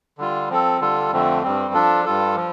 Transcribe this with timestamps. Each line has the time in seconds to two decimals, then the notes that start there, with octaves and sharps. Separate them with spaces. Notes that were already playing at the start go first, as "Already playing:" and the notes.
0.18 D3 G3 F4
0.49 F3 C4 A4
0.80 D3 G3 F4 A4
1.12 F2 D3 F3 A3 C4
1.43 G2 G3 C4
1.74 F3 D4 F4 A4
2.05 G2 G3 F4 A4
2.36 F3